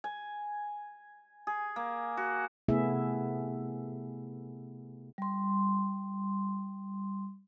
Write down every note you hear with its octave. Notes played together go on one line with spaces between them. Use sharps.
G#5
G#4
A#3
F#4
C3 A3 B3 E4 G#4 E5
G3 C6